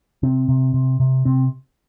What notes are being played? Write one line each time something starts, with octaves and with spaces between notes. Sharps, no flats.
C3 C4
C3
C3
C3
C3 C4